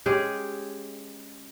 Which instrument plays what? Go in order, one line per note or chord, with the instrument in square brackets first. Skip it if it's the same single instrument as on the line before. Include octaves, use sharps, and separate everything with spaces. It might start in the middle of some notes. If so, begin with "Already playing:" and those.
[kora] G#3 C#4 G4 G#4